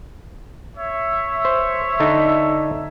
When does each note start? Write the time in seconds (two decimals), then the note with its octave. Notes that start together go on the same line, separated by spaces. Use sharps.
0.75 C#5 E5
1.45 C5
2.00 D3 D4 D#4